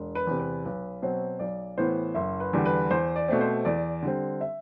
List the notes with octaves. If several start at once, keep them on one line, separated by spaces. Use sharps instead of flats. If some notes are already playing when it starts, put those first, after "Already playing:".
Already playing: E1
B4
E2 C3
B4
B1 B4
B2 F#3 C4 C5
B1 D5
A2 E3 B3 C5
F#1 E5
B4
E2 D3 G3
B4
E2 C5
D5
B2 A3 C4
C5
E2 D5
D3 G3 C4
E5